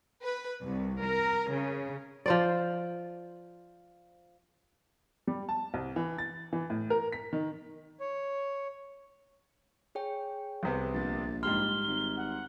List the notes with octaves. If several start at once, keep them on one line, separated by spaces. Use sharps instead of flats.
B4
C2
A#4
C#3
F3 C5 D5
G3
A5
C2
E3
A6
E3
A2
A#4
B6
D#3
C#5
G#4 C#5 G5
C2 C3 B3
A#1 A6
G#2 G3 C6 F6 G7
G#1
F#5